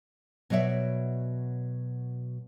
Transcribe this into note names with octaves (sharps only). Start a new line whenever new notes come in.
B2 F#3 C#5 D5 E5